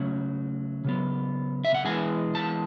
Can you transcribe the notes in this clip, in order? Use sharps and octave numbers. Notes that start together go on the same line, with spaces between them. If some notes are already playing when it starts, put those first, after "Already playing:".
Already playing: C#3 F#3 A3 C#4
C#3 F#3 B3
E5
F#5
E3 G#3 B3 G#5
A5